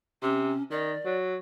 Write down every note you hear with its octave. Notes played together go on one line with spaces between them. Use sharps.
C3 C#4
D#3 D5
F#3